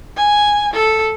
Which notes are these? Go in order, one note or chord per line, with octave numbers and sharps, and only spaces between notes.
G#5
A4